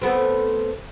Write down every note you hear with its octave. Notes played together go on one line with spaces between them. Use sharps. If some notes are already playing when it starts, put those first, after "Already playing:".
A3 B3 C4